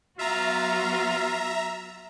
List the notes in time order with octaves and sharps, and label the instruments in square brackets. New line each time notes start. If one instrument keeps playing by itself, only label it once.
[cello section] F#3 B3 F#4 [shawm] F4 [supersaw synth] E5 A#5